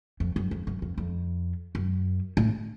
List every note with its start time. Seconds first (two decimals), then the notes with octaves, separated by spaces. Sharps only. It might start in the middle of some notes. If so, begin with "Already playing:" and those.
0.20 F2
0.36 F#2
0.51 F2
0.67 F#2
0.82 F2
0.98 F2
1.75 F#2
2.37 A2